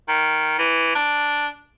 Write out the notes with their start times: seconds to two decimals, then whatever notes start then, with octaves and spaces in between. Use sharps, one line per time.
0.09 D#3
0.59 E3
0.95 D4